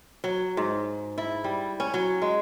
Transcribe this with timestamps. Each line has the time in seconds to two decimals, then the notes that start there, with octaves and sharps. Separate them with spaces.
0.24 F#3
0.57 G#2
1.18 E4
1.44 G3
1.80 C#4
1.94 F#3
2.22 G#3